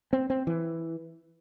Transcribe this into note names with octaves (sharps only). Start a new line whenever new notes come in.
C4
C4
E3